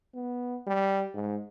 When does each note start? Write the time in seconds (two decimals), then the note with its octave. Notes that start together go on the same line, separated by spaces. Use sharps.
0.14 B3
0.67 G3
1.14 G#2